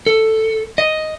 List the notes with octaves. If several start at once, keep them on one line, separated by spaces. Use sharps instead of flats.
A4
D#5